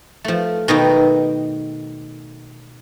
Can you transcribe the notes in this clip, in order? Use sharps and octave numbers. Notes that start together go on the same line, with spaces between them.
F3 A3
B2 D#3 D#4 B4 G5